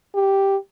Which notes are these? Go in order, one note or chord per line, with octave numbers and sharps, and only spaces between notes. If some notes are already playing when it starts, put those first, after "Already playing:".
G4